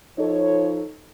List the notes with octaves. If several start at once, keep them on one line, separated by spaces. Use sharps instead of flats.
F3 D#4 A4 C#5